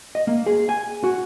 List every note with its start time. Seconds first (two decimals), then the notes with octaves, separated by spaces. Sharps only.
0.15 D#5
0.27 A#3
0.46 G#4
0.69 G#5
1.04 F#4